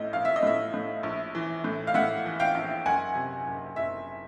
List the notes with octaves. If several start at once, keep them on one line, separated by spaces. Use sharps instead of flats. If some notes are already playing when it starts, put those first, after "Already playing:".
Already playing: A#1 A2 D#5
A#1 F5
E5
D#5
A2 E5
A2
A#1
E3
A2
F5
A2 E5 F#5
E3
F5 G5
A#1
F#1 F#5 G#5
C3
F#1
F#1 E5